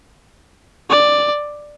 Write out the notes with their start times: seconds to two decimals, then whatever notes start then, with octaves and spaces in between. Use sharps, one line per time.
0.90 D5